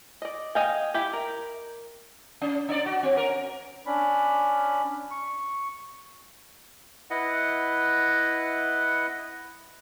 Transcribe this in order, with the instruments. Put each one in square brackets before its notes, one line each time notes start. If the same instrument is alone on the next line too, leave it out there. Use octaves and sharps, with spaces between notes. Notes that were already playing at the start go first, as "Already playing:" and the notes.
[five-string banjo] D5 D#5
D#5 F5 G5 G#5
E4 G4
A#4
[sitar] C#4
D4 D5
F#4
C4
C#4 A#4
[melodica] C#4 D4 B5
C#6
[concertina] E4 B4 D#5 F#5